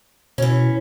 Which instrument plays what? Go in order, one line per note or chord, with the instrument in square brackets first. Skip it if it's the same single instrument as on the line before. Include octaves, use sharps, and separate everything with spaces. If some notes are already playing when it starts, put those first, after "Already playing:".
[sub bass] B2 [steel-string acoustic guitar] E3 C#4